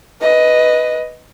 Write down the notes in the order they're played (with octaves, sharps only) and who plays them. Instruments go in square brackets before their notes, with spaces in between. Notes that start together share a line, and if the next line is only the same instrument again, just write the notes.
[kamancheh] B4 D#5